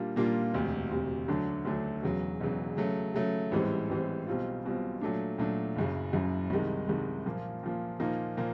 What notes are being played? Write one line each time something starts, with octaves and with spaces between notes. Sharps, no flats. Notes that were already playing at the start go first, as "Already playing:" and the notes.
Already playing: A#2 G3 A#3 D4 F4
A#2 G3 A#3 D4 F4
E1 D2 C3
E1 D2 C3
D2 D3 F#3 A3 D4
D2 D3 F#3 A3 D4
E1 E2 C#3 F#3
E1 E2 C#3 F#3
C#3 F#3 A3
C#3 F#3 A3
A1 G#2 E3 G3 C4
A1 G#2 E3 G3 C4
B1 B2 G3 C4 F4
B1 B2 G3 C4 F4
A#2 F#3 A3 D4
A#2 F#3 A3 D4
F#1 F#2 C#3
F#1 F#2 C#3
C2 C3 D#3 G#3
C2 C3 D#3 G#3
A#2 F3 A#3
A#2 F3 A#3
A#2 F3 A#3 D#4
A#2 F3 A#3